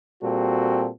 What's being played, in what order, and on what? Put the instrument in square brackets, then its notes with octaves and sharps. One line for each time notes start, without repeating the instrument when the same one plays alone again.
[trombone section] A#2 G3 C4 F#4 A4